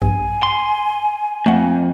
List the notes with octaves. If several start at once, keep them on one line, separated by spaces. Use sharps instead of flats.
A#1 G2 G#5
C6
F2 A3 F#5